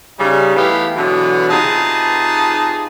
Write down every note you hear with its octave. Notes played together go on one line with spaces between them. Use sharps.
C#3 G3 D#4
E3 A3 B3 G4 F5
B2 D3 E3 F#3 G#3 B3
C3 D#4 F4 G#4 B4 A5